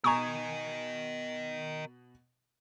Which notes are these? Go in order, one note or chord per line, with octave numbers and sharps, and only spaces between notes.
B2 A#4 D#5 G#5 A#5 C#6 D#6 G#6